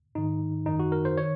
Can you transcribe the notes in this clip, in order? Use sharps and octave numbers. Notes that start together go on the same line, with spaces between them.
G#2 D#3 D#4
F#2 D#3 D#4
F#4
A#4
C5
D#3 C#5